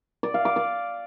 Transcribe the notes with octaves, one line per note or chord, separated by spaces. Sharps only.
D5
F5
D6
D5